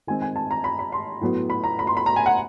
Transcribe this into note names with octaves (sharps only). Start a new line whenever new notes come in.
D#3 G#3 C4 G#5
G#5
A5
A#5
B5
B5
C6
A2 F#3 B3
B5
A#5
B5
C6
B5
A#5
G#5
F#5